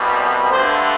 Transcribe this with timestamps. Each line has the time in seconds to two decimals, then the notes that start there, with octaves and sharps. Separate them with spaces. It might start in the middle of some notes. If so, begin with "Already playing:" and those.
Already playing: C2 B2 G3
0.50 G2 D3 A3 C5